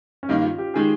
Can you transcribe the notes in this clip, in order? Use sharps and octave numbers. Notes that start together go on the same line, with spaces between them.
C#4
G2 D#3 A#3 D#4
F4
G4
D#3 G#3 G#4